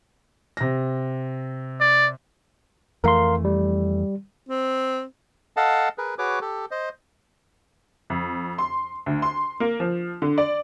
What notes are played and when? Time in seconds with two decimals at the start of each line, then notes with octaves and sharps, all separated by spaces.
0.57 C3 A#6
1.81 D5
3.04 F2 E3 A3 A#4 F5 C6
3.45 G3
4.49 C4
5.57 A4 D#5 F5 F#5 A5
5.98 G#4 A#4 B4
6.18 F#4 G#4 B4 C#5 D6
6.41 G4 A4
6.71 C5 D#5
8.10 F2
8.58 C6
9.06 D2
9.22 C6
9.60 A#3
9.80 F3
10.22 D3
10.38 D5